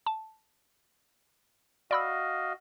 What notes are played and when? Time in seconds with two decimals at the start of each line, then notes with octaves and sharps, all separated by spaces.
0.06 A5
1.91 F#4 D5 D#5 F5 B5 E6